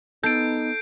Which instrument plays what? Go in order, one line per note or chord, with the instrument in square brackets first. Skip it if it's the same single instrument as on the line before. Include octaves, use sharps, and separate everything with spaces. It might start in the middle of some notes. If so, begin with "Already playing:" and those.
[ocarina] B3 [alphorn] D#4 [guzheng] A4 [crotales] G6 C7 D7